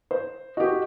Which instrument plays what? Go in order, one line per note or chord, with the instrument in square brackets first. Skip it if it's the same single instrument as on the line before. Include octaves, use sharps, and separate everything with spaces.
[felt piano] C5
[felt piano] F#4 G4 [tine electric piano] D#5